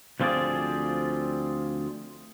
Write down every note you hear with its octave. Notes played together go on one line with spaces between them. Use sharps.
D2 F3 C4 F4 G#4 D5